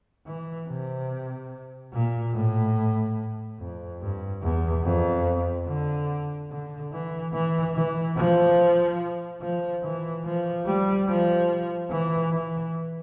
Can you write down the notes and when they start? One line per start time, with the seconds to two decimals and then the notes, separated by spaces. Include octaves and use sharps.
0.26 E3
0.68 C3
1.93 A#2
2.34 A2
3.59 F2
4.01 G2
4.43 E2
4.84 F2
5.67 D3
6.50 D3
6.92 E3
7.34 E3
7.75 E3
8.17 F3
9.42 F3
9.83 E3
10.25 F3
10.67 G3
11.08 F3
11.91 E3
12.32 E3